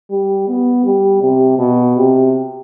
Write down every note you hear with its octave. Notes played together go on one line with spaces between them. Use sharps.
G3
B3
G3
C3
B2
C3